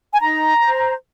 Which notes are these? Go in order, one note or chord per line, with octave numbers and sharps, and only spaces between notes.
G#5
D#4 A#5
C5